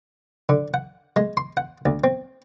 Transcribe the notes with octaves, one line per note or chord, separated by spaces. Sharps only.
D3
F#5
G#3
C6
F#5
D2
C4